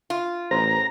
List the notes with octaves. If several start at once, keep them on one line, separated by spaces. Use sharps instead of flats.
F4
A1 C5 A#5